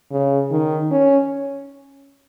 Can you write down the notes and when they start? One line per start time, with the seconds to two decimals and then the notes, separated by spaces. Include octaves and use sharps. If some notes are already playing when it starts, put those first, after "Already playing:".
0.11 C#3
0.51 D#3
0.91 C#4